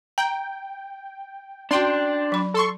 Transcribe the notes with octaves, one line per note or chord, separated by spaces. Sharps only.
G5 A#5
C#4 D4 F#4 G5 C6
F#3 B5
A4 C6 C#6